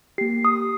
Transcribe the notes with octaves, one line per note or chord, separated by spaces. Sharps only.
A#3 G4 C7
D#6